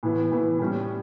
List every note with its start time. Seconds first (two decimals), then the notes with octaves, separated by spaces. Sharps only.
0.03 A2 E3 B3
0.31 A2 E3 B3
0.59 A2 G3 C#4